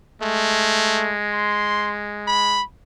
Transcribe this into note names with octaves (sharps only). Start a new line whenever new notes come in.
G#3 A3
C6
B5